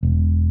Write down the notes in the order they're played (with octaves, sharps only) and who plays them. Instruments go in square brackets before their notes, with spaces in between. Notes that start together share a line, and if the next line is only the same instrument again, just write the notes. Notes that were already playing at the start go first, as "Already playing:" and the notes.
[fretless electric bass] E1